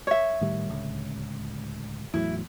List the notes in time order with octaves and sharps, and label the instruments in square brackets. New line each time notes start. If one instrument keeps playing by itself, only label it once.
[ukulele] C#5 E5
[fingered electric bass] A2 D#3 G3
D1 C#2
[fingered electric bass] E2 A2 F#3 [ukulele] E4